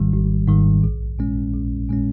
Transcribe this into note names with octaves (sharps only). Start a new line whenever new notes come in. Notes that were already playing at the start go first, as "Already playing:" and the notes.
Already playing: G#1 G#2 D#3 G3
G#1
G#2 D#3 G3
A#1
A#2 G#3 C#4
A#1
A#2 G#3 C#4